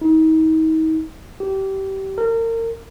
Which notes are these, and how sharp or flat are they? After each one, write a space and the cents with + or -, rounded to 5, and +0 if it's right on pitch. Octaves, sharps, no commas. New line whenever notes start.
D#4 +35
G4 -25
A#4 -35